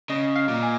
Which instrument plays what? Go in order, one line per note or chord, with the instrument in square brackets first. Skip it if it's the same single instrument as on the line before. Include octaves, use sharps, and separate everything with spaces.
[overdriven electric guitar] C#3 [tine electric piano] D#5
[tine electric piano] F5
[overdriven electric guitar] A#2
[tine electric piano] G#5